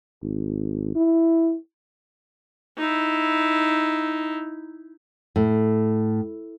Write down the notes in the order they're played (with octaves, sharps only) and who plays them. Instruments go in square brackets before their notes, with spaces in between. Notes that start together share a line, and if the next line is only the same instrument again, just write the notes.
[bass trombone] G#1
E4
[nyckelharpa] D#4 E4
[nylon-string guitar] A2